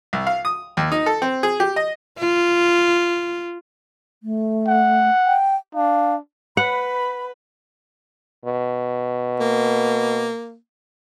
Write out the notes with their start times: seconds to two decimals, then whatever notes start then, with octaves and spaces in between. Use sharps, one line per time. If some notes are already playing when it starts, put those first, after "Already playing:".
0.13 C2
0.27 F5
0.45 D#6
0.77 D#2
0.92 D#4
1.06 A4
1.22 C4
1.43 G#4
1.60 G4
1.76 D#5
2.19 F4
4.23 A3
4.68 F#5
5.26 G5
5.75 D4 F5
6.57 B4 F#5 B5
8.45 B2
9.40 A#3